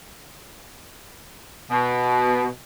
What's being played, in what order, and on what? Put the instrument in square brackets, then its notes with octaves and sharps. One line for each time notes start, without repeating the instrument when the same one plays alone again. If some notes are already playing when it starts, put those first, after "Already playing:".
[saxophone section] B2